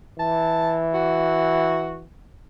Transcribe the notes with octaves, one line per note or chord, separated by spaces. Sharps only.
E3 A5
F#4